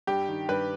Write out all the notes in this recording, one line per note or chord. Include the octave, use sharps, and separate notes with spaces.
G2 G4
D#3
G2 B4